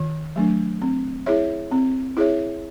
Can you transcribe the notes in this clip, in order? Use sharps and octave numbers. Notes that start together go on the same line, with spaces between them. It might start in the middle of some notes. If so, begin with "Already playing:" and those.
Already playing: D#3
F#3 A3 D4
C4
E4 G#4 C#5 E5
C4
E4 G#4 C#5 E5